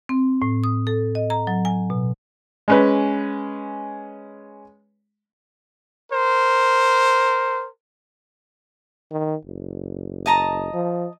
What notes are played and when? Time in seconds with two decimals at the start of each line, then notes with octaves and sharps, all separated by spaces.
0.09 C4
0.42 A2
0.64 D#6
0.87 A4
1.15 D#5
1.30 A#5
1.47 F#3
1.65 G#5
1.90 B2
2.68 G#3 C#4 B4
6.11 A#4 C5
9.11 D#3
9.45 F#1
10.26 D#5 A5 A#5
10.74 F3